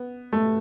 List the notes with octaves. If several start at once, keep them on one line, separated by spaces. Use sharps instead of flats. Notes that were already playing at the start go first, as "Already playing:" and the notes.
Already playing: B3
A3